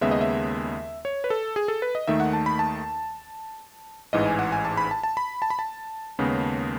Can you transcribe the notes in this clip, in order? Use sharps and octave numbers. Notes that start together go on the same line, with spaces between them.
D#2 C#3 G#3 B3 E5
D#5
E5
C#5
B4
A4
G#4
A4
B4
D#5
D#2 D#3 A3 E5
F#5
A5
B5
A5
A1 G#2 E3 D#5
G#5
F#5
G#5
A5
B5
A5
A5
B5
A5
B5
A5
D#2 C#3 G#3 B3